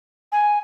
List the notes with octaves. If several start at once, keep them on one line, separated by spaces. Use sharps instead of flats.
G#5